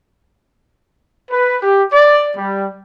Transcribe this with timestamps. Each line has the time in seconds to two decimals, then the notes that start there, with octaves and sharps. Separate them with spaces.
1.30 B4
1.62 G4
1.92 D5
2.35 G3